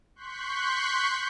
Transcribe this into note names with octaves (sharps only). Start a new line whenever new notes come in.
C6 C#6 F#6 G6 B6